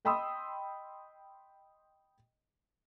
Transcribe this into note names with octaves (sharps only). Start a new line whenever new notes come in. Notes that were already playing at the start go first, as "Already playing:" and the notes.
D#5 G5 B5 C6 D#6 E6